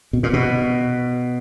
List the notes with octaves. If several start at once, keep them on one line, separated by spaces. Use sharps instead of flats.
B2
A#2
B2